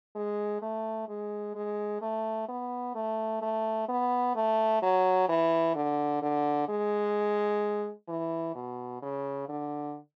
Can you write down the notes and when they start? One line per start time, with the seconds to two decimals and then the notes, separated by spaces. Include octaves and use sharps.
0.15 G#3
0.62 A3
1.08 G#3
1.55 G#3
2.02 A3
2.48 B3
2.95 A3
3.42 A3
3.88 B3
4.36 A3
4.82 F#3
5.29 E3
5.75 D3
6.22 D3
6.69 G#3
8.08 E3
8.55 B2
9.02 C#3
9.49 D3